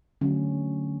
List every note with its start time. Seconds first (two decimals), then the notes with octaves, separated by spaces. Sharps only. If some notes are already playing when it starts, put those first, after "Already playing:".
0.21 D3 F#3 A3 C#4